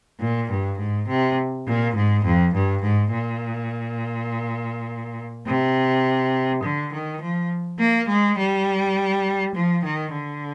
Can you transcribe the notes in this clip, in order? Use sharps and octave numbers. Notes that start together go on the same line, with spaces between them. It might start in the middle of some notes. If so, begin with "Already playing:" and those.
A#2
G2
G#2
C3
A#2
G#2
F2
G2
G#2
A#2
C3
D3
D#3
F3
A#3
G#3
G3
F3
D#3
D3